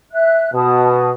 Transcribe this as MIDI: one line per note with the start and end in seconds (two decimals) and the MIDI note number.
0.12 0.51 76
0.12 0.51 90
0.54 1.11 47
0.54 1.09 81
0.54 1.09 87